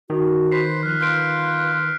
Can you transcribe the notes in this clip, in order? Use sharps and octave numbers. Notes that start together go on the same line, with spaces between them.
D#3 F#4
B4 C5 B6 C7
F3 F6 F#6
F4 B4 F6 G6 D7